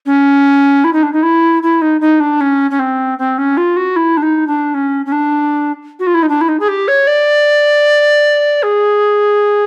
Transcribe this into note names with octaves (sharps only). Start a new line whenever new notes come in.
C#4
E4
D#4
D4
D#4
E4
E4
D#4
D#4
D4
C#4
C#4
C4
C4
C#4
F4
F#4
E4
D4
D#4
D4
C#4
C#4
D4
F#4
F4
E4
D#4
D4
E4
D#4
G#4
G4
C#5
D5
G#4